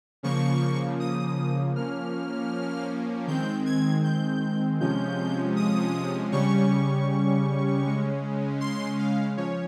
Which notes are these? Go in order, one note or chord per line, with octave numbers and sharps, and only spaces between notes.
C#3 F3 A#3 C#6
D#6
F3 A#3 C#4 F6
D#3 G#3 C4 G6
G#6
G6
C3 F3 G#3 C#4 G6
D#6
C#3 G3 C#4 C#6
C#3 G#3 C#4
C6
F5
F3 C#4 C#5